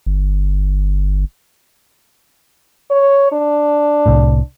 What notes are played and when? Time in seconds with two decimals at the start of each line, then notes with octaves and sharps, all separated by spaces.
0.06 G1
2.91 C#5
3.32 D4
4.06 C2 A2